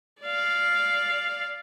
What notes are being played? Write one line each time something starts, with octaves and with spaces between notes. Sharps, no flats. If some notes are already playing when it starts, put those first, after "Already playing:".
D5 F5